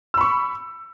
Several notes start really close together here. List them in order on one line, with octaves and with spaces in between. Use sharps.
E6 B5 C#6